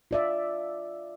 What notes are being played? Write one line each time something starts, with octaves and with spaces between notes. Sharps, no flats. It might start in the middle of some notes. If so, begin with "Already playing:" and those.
F4 D5 E5